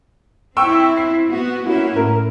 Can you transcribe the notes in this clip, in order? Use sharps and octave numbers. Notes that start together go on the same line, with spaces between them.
C4 E4 G5 C#6 E6
C7
B3 F#4
A#3 C#4 E4 F#4
A2 A#4